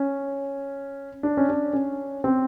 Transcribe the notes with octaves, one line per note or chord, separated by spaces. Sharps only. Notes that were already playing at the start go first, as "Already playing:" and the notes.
Already playing: C#4
D4
C#4
D4
C#4
C4